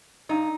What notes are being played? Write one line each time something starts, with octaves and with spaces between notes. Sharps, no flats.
G2 D#4